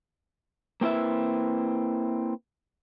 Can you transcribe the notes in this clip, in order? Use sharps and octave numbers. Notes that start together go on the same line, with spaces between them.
A#3 C4 E4 B4 E5